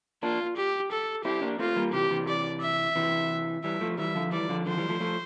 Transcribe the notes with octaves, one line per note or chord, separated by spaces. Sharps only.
A#3 D4 F4
G4
A4
C4 E4 G4
A#3 D4
A3 C4 F4
G3 A#3
C3 E3 G4
C3 E3
D5
E5
C3 E3
E3 G3 E5
F3 A3
E3 G3 E5
D3 F3
E3 G3 D5
D3 F3
D3 F3 C5
E3 G3
F3 A3
F3 A3